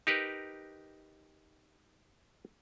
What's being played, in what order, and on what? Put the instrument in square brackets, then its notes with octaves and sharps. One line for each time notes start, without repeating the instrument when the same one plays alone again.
[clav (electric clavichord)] D#4 G4 A#4 B4